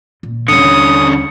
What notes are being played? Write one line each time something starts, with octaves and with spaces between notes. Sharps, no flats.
A#2
D#2 D3 G3 C#4 D#6 C#7